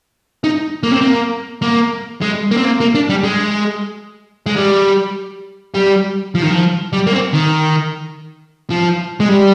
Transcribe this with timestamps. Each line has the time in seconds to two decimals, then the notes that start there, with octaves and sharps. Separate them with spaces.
0.44 D#4
0.83 A#3
0.92 C4
1.01 A#3
1.62 A#3
2.21 G#3
2.51 A#3
2.57 C4
2.65 A#3
2.80 A#3
2.95 D4
3.10 G3
3.24 G#3
4.46 G#3
4.56 G3
5.75 G3
6.35 F3
6.42 D#3
6.50 F3
6.93 G3
7.07 A#3
7.13 C4
7.33 D#3
8.70 F3
9.20 G#3
9.29 G3